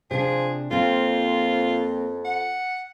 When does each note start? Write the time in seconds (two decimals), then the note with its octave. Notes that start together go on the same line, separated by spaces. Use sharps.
0.11 C3 F3 D4 G#4
0.71 F2 A#3 C4 F4
2.25 F#5